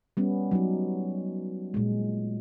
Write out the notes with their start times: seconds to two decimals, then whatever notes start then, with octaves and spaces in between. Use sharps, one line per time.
0.17 G3 B3 C#4
0.51 F#3 D#4
1.74 A#2 G#3